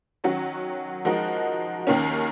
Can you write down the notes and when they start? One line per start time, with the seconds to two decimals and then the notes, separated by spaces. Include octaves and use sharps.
0.24 D#3 F#3 C#4 F#4
1.05 F3 G#3 D#4 F#4 A#4
1.87 D#2 D#3 A#3 C#4